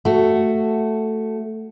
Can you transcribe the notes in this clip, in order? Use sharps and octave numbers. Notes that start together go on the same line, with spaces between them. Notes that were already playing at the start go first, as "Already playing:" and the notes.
A3 F#4